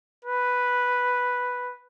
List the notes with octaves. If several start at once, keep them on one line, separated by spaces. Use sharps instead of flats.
B4